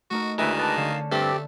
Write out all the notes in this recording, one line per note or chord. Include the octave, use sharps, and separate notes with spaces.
A3 D#4 F#4 A#4
D2 D#3 G#3 E4 G#4 B4 D5 E5
B4 D5 D#5 F5 A5
D3 C#4 F5 A5
G2 A3 C4 G4 D5